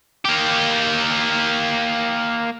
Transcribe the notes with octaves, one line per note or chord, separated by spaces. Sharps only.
A#3 G4